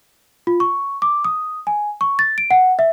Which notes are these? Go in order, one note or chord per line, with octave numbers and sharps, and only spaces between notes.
F4
C#6
D6
D#6
G#5
C#6
A6
D7
F#5
E5